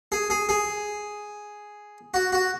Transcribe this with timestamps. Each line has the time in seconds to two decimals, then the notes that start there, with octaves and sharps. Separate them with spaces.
0.12 G#4
0.30 G#4
0.49 G#4
2.14 F#4
2.33 F#4